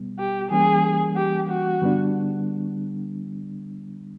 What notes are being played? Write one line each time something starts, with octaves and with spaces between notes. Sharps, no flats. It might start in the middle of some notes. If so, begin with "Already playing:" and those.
Already playing: B2 G3 B3
G4
E3 G3 A#3 C#4 G#4
G4
F#4
G2 D3 G3 B3 D4